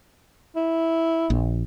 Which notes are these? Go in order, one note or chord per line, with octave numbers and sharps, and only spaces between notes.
E4
A#1